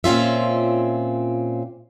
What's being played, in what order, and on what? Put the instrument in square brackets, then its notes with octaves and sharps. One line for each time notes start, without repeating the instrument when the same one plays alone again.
[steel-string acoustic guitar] A#2 C4 C#4 F4 E5